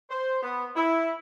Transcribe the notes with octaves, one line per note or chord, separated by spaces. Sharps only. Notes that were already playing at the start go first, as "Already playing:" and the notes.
C5
B3
E4